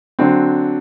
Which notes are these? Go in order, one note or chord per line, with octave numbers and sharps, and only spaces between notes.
D3 F#3 C4